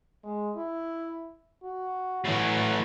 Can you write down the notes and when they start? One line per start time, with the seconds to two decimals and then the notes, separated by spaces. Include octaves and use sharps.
0.24 G#3
0.56 E4
1.64 F#4
2.25 A2 E3 F#3